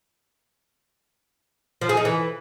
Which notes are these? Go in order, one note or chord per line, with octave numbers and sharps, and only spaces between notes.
F3
G#4
D#4
E3